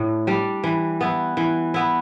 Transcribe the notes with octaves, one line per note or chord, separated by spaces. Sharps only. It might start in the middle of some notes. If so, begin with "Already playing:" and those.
Already playing: A2 D4
G3 D4
E3
B3 E4
E3
B3 E4